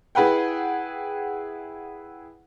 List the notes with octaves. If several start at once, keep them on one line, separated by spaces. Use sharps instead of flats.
E4 G#4 B4 F#5 G5